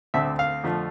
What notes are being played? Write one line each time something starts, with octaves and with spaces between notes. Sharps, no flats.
D2 D3 A3 C4 E5
F5
F2 D3 F3 A3